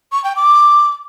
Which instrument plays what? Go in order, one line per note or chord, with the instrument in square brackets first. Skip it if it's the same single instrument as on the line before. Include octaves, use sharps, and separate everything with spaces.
[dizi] C#6
G5
D6